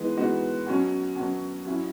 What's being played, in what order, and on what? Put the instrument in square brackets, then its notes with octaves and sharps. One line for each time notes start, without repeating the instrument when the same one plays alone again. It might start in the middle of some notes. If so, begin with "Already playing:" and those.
Already playing: [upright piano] E3 G#3 B3 D#4
E3 G#3 B3 D#4 F#4
B2 F#3 C#4
B2 F#3 C#4
F#3 C#4 E4